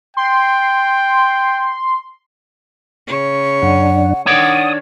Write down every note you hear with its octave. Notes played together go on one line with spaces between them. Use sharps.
G5 C6
C#3 C#5
F#2 D4 F#5
D#3 D4 C#5 D5 F#5 D#6